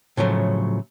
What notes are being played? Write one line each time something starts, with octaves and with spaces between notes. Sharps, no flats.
A2 C#3 F3 F#3 A3